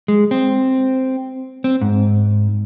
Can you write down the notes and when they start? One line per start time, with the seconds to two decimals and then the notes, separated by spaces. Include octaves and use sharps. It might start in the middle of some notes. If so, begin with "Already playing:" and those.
0.08 G#3
0.31 C4
1.64 C4
1.81 G#2